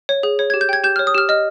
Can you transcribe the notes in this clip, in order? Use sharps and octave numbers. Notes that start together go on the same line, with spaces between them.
C#5
G#4
C#5
G#6
G4
G6
G5 G#6
G4 G6
F6
C#5
D#6
G4 F6
D#5 F6